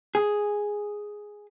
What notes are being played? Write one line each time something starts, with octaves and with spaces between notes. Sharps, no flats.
G#4